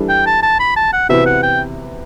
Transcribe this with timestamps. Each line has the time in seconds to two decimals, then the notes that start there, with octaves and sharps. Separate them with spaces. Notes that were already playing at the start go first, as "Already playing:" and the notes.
Already playing: E3 G3 D4 A4
0.09 G5
0.26 A5
0.43 A5
0.60 B5
0.76 A5
0.93 F#5
1.09 C3 E3 B3 F#4 B4 E5
1.26 F#5
1.43 G5